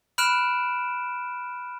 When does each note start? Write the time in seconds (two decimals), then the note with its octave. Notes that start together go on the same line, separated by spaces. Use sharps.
0.18 B5 F6 F#6 D7 E7